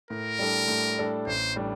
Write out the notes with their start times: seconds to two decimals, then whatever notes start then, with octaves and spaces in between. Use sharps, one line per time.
0.10 A2 A#4
0.39 G3 D4 A4
0.68 A2
0.99 G3 D4 A4
1.27 A1 C5
1.56 A2 G3 D4